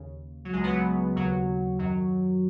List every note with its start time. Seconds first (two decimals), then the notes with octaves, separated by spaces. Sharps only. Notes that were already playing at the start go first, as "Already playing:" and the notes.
Already playing: D#2 C#3
0.45 F#3
0.52 C#2 C#3 G#3
0.63 F#3 B3
0.73 F#3
1.16 D#2 C#3 F#3
1.79 F#2 D#3 F#3